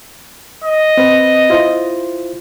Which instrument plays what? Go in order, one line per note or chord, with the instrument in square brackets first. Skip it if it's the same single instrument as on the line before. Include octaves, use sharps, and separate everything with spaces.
[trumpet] D#5
[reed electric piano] C4 B4
E4 F4 C5